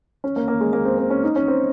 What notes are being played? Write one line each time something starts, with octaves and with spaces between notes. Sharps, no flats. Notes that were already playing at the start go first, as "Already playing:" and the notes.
C#4
A#3
A#3
G#3
A#3
C4
C4
C#4
D#4
C#4
C4